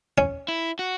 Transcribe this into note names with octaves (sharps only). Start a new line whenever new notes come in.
C#4
E4
F#4